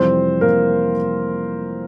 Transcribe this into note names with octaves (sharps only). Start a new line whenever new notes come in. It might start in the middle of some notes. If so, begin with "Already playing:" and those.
Already playing: F2 C3 E3 G3 C4 C5
A#3 A#4